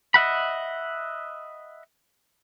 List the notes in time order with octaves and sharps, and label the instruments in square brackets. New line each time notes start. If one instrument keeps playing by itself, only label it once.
[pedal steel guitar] D#5 E5 F#5 B5